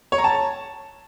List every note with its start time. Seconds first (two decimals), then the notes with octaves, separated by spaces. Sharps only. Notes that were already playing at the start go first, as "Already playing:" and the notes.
0.12 C#5
0.18 A#5
0.24 A5